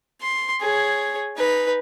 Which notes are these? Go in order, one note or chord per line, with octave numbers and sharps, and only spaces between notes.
C6
G#4 C#5
D#4 B4